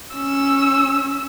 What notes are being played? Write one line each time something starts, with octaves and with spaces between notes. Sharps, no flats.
C#4 E6